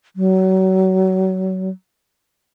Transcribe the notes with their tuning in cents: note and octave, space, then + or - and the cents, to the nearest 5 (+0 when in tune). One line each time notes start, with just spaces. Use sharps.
F#3 +30